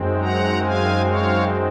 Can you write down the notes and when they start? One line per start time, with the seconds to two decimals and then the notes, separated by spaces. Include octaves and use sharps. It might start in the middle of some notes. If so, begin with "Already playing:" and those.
Already playing: F#2 D#3 G#3 C4
0.21 F#5 A#5
0.63 F5 G#5
1.06 C#5 F5